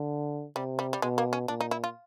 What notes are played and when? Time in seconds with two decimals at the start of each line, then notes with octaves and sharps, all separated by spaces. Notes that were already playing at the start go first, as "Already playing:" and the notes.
Already playing: D3
0.55 C3 G3
0.79 G3
0.93 G3
1.02 B2 G#3
1.18 A#3
1.33 C#4
1.48 A#2 D4
1.61 D#4
1.71 E4
1.84 F4